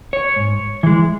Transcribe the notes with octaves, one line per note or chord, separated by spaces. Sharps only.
C#5
G#2
E3 G#3